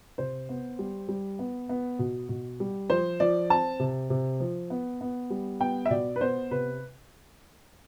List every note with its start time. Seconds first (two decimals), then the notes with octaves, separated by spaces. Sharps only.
0.18 C3 C5
0.49 B3
0.79 G3
1.09 G3
1.39 B3
1.69 B3
1.99 B2
2.29 B2
2.60 G3
2.90 F3 C5
3.20 F3 D5
3.50 C4 A5
3.80 C3
4.10 C3
4.40 F3
4.70 B3
5.01 B3
5.30 G3
5.60 B3 G5
5.86 E5
5.90 B2 D5
6.16 B4
6.21 B3 C5
6.51 C3 B4